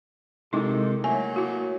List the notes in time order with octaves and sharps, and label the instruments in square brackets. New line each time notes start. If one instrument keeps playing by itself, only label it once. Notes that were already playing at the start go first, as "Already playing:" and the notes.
[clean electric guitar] C3 G#3 [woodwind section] D#3 G4 A4 [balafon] D#4 E4
[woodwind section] F#3 A3 [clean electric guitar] A#3 [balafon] G#5
[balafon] E4 F#4